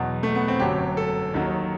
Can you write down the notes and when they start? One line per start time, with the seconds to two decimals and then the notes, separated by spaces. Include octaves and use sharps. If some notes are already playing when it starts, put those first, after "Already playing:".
Already playing: E2 B2 F#3
0.23 A3
0.35 B3
0.48 C4
0.59 G1 F#2 F#3 G4
0.97 A4
1.34 D#2 D#3 F#3